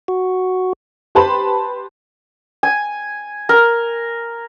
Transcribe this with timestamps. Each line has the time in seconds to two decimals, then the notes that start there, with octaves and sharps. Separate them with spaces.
0.08 F#4
1.15 G4 B4 C5 A5 B5 C6
2.63 G#5
3.49 A#4